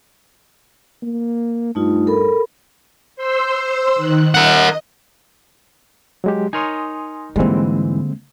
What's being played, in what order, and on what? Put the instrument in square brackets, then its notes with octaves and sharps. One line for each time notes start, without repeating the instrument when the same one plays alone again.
[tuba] A#3
[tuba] G2 [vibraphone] A3 D#4 F4
[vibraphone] A4 A#4 B5
[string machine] C5 C6 E6
D#3 F#6
[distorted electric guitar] A#4 F#5 [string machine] D#5
[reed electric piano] F#3 G#3 G4
[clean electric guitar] D#4 A#4 C#5 [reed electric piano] G#5 C6 D#6
[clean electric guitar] G#2 E3 [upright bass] D3 A#3 [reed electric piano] G3 G#3 C4